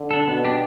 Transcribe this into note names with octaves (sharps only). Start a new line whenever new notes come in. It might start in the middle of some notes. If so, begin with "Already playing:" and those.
Already playing: D3
D4 A4
B2 B3
D4 G4